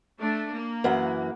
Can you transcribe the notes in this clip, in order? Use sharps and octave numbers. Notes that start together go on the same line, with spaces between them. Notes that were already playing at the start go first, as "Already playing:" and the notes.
A3 D4
A#3
F#2 E3 F#5